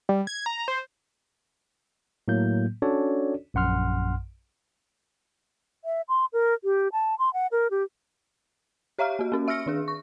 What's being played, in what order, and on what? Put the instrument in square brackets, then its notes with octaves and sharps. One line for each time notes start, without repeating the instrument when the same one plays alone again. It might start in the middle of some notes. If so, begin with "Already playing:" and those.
[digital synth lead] G3
G#6
A#5
C5
[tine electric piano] A2 F#3 A#3 G6
C#4 D4 F#4 A4 C#5 D5
A#1 F#2 F#5 C6 F6
[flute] E5
C6
A#4
G4
A5
C6
F#5
A#4
G4
[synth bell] G4 C#5 E5 F5 A#5 F6
A#3 F#4
A#3 C#4 F#4
E5 E6 F6 A#6 C#7
D#3 D4 G#4
C#6